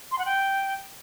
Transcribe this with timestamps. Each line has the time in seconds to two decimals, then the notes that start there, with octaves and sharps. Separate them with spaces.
0.12 C6
0.19 F#5
0.25 G5